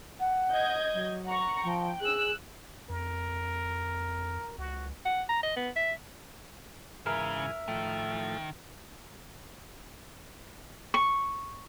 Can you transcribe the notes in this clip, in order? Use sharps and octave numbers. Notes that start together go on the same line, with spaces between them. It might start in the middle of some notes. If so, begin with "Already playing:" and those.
F#5
D#5 G6 G#6
F#3
F#5 A#5 C#6
F3 G5
G#4 E6 F#6
F2 A#4
C#2 F#4
F#5
A#5
D#5
B3
E5
G#2 C#3 E3 A#4 E5 G#5
A2 D#3 F3 A3
C#6